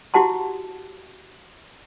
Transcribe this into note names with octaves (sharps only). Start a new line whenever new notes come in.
E4 F#4 G4 F#5 A5 C6